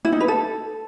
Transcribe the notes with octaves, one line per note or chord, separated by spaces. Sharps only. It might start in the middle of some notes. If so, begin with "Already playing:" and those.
E4
D#4
B4
A4